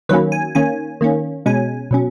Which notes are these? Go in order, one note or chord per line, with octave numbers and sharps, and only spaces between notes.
D#3 F#3 A#3 C#4 B4
G#5
D#3 A#3 C#4 G#5
D#3 A#3 C#4
B2 G#3 C#4 G#5
B2 F#3 C#4